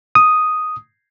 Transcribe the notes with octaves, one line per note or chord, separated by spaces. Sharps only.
D#6